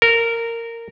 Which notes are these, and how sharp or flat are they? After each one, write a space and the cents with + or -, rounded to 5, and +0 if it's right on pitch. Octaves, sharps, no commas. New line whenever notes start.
A#4 -15